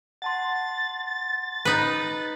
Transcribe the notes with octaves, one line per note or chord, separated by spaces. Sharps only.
F#5 A5 C6 A6
D#4 B4